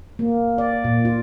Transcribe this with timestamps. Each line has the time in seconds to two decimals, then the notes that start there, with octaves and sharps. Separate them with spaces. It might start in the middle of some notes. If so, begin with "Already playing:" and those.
0.19 A#3
0.58 D5
0.84 A#2
1.05 F4